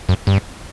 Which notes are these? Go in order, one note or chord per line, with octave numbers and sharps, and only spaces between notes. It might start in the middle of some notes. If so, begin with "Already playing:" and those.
F#2
G2